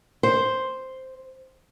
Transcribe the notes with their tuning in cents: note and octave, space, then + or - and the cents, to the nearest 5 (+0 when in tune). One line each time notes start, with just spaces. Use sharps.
C5 +0